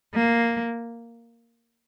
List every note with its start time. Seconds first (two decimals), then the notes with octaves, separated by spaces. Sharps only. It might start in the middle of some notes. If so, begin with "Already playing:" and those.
0.14 A#3